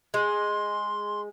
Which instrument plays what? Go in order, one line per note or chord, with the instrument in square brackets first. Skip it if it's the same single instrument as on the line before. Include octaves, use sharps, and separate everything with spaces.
[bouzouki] G#3 [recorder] C6